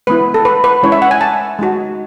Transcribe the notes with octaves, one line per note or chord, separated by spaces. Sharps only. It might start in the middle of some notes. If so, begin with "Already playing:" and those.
G#3 B3 E4 B4
A4
B4
B4
G#3 C#4 E4 C#5
E5
F#5
G#5
A5
G#3 D#4 F#4